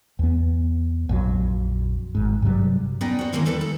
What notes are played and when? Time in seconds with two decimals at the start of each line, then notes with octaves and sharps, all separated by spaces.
0.19 E2 B3
1.09 A#1 F2 F#3
2.15 G#1 G#2
2.42 G2 C3 F#3 G3
3.01 B3 C#4 D#4 D5 D#5 G5
3.19 F#4 C5
3.33 D#3 E3 G#3 A#3 C4 C#4
3.45 E2 G3 A4 B4 A5 A#5
3.61 A4